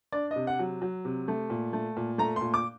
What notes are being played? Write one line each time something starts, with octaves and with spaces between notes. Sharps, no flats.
D4 D5
C3 D#5
F#5
F#3
F#3
C3
A3
A#2
A3
A#2
A3 A#5
A#2 C6
D6